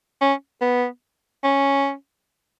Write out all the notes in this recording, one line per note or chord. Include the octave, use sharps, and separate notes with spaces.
C#4
B3
C#4